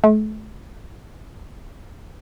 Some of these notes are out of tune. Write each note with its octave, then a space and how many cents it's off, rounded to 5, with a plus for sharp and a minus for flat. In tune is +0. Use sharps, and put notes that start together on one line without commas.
A3 -35